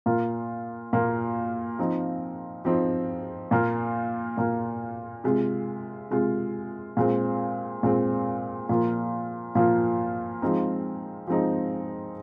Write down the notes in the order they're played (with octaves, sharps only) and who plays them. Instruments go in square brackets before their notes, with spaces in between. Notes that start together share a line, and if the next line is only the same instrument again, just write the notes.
[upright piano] A#2 A#3 F4
A#2 A#3 F4
F3 C4 D#4
F3 C4 D#4
A#2 A#3 F4
A#2 A#3 F4
C3 G#3 F4
C3 G#3 F4
A#2 G#3 C4
A#2 G#3 C4
A#2 F3 A#3 F4
A#2 F3 A#3 F4
F3 G#3 C4 D#4
F3 G#3 C4 D#4